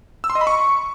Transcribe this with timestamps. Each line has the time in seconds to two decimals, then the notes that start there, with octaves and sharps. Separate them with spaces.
0.24 E6
0.30 C6
0.35 D#5
0.41 B5
0.47 C#6